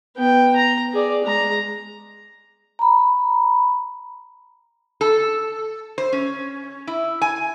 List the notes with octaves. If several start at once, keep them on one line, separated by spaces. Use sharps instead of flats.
B3 G5
A#5
G#4 D5
G#3 A#5
A#5 B5
A4
C5
C#4
E4
G#5